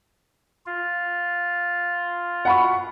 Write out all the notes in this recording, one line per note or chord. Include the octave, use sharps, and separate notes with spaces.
F4
F#5 B5 C#6